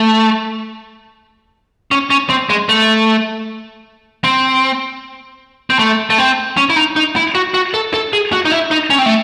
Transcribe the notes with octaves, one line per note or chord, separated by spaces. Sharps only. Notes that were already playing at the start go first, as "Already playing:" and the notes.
Already playing: A3
C#4
C#4
C4
G#3
A3
C4
C4
A3
A3
C4
C#4
E4
D#4
D#4
E4
F#4
F#4
A4
A4
G#4
F#4
D#4
E4
D#4
C#4
C4
A3